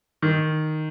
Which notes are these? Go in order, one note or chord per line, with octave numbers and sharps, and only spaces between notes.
D#3